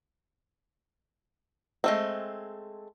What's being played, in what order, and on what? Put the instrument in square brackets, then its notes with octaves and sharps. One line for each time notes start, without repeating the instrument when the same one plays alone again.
[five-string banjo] G#3 A3 C4